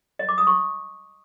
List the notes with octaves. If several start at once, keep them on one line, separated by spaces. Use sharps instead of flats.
D#5
D6
D#6
C#6